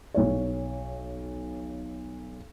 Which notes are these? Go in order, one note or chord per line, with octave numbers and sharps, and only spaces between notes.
B1 C#5